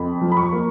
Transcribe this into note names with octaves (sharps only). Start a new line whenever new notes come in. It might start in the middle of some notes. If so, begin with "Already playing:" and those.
Already playing: F2 B5
F3
B5
C#6
A#3